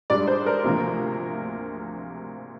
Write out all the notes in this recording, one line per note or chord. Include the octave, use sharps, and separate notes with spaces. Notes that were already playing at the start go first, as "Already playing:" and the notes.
G#2 G3 D4 D5
C5
A#4
D2 C3 F3 A#3